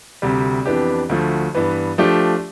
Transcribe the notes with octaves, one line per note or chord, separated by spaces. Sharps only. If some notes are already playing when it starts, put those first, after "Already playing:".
D2 C3 G3
F2 E3 B3 D4 G4
D2 D3 F3 A3
G2 E3 B3
F3 A3 D4 G4